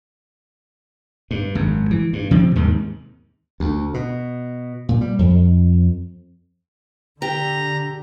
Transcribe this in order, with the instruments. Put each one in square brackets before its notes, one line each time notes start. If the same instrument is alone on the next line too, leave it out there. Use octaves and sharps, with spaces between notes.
[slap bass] G2
G#1 F#2
E3
G2
C3 F3 A#3 C4
D#2 G#2 C3 D#3
D2
B2
A#2
G3
F2
[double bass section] D3 [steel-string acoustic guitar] G4 [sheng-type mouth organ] A#5